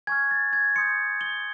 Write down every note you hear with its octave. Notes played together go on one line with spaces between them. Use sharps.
G#5 C#6 F6 G#6
A6
G#6
C6 D#6 G6 C#7
G7